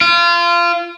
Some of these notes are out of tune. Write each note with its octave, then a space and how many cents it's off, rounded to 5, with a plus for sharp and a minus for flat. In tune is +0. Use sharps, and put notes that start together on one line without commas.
F4 -25